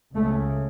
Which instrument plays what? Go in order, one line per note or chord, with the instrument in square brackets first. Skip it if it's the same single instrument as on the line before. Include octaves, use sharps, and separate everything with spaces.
[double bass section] C#2 C#3 A3